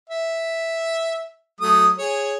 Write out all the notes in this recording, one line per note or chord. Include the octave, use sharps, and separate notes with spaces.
E5
F#3 A3 D#6
G#4 C#5